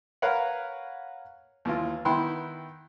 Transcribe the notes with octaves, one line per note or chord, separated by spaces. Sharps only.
A#4 B4 C#5 F5 F#5
D#2 E3 F4
D#3 B3 E4 G5 B5 C6